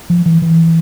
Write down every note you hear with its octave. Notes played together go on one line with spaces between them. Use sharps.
F3
E3
E3